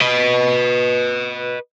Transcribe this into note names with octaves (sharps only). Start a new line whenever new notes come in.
B4 D#5